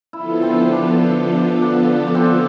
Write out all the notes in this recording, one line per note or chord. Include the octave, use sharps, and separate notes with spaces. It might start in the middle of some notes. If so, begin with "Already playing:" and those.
D3 F3 B3 E4 F4 A4
C4
D4
D4
D4
D4
D4
C4